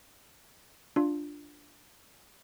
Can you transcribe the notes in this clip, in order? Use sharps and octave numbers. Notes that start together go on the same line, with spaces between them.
D4 F4